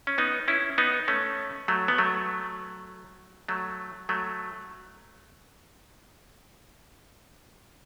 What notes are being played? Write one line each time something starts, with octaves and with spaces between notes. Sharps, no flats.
C#4
B3 D#4
C#4 E4
B3 D#4
A3 C#4
F#3 A3
B3
F#3 A3
F#3 A3
F#3 A3